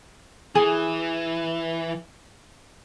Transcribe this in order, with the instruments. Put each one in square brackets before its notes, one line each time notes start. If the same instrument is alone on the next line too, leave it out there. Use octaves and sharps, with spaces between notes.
[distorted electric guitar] E3 [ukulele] G#4